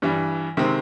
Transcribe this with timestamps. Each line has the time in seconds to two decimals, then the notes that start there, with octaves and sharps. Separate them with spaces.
0.02 G2 E3 G3
0.57 C3 D#3 G#3 C4